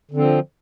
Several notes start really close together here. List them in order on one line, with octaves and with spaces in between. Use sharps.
D3 C4 F3